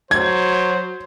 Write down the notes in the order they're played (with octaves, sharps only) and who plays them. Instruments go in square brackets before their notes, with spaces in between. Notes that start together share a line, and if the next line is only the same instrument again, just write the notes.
[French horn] F#3 [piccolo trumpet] C5 [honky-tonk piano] G#6